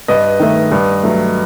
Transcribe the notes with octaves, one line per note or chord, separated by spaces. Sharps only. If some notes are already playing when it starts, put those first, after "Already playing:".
G2 B4 D#5
D#3 A3
G2
F#3 A3